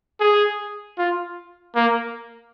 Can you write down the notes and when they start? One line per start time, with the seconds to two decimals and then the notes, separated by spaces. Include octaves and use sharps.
0.20 G#4
0.98 F4
1.75 A#3